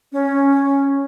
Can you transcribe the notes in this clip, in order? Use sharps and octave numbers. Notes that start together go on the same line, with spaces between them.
C#4